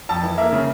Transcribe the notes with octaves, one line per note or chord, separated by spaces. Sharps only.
F2 A5
E3
A#3 E5
C#3